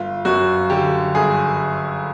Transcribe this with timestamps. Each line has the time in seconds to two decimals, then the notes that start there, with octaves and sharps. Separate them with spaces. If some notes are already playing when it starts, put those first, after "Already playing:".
Already playing: G1 F4
0.25 F#2 F#4
0.70 D3 G4
1.15 G1 G#4